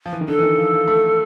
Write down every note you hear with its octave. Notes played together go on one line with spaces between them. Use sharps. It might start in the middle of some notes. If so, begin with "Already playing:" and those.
F3
E3
D#3
D3 A4
E3
D#3
F3
F3
A3